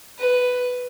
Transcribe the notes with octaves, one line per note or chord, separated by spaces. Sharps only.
B4